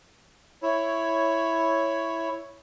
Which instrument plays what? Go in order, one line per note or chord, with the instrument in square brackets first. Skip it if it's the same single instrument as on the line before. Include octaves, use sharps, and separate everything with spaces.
[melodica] E4 [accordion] C#5